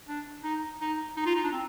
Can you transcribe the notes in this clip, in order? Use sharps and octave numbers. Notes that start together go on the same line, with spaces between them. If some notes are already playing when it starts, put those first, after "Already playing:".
D4
D#4
D#4
D#4
F4
D#4
D4
C4